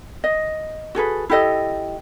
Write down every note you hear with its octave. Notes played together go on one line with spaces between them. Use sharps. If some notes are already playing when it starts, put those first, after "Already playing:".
D#5
F#4 G#4 A4 B4
E4 G4 A4 D#5